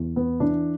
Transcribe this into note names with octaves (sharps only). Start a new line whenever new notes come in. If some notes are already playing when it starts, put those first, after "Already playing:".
Already playing: E2
B3
E3 D4